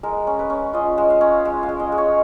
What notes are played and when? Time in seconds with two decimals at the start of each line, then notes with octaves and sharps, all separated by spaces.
0.03 G#3 A#4
0.27 C#4
0.39 B4
0.50 C#4
0.73 F4 D#5
0.98 G#3
1.10 F5
1.21 C#4
1.45 G#3
1.63 F5
1.69 G#3
1.80 D#5
1.92 G#3
1.98 C#5